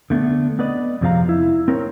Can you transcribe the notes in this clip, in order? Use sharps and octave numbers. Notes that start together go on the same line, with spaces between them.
D3 A3 B3 D4
B3 B4 D5 D#5
F2 C3 F3 G#3 F5 A#5
E4
C4 A#4 C#5